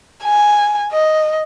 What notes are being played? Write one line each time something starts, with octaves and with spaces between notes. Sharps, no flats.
G#5
D#5